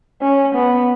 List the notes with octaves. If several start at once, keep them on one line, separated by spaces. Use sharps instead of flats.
C#4
B3